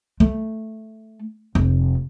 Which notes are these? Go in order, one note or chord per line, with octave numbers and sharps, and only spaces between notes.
A3
F1